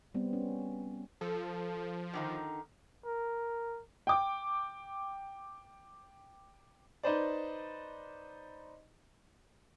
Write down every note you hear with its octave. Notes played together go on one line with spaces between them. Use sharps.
G3 B3 C4
C#4
F3 A4
D3 D#3 D#4
A#4
G5 D6
D#4 B4 C5 D5